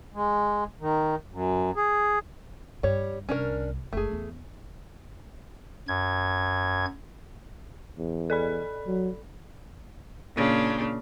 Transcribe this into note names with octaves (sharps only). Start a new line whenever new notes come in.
G#3
D#3
F#2
G#4
G2 G3 C#5
C2 C#4 D4 A#4
F#1 G#3 A3 G#4
E2 B3
F#2 G#6
E2
A4 D5 B5
F#3
A#2 C#3 D4